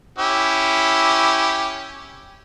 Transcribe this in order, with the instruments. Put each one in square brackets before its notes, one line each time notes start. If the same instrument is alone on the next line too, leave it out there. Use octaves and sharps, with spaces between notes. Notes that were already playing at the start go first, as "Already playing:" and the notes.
[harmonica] C#4 E4 G4